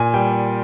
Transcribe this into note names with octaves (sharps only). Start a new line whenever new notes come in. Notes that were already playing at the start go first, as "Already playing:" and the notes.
Already playing: A#2 G#5
G3 G5